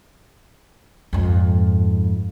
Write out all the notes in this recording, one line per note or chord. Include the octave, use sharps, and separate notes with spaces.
F2 G#2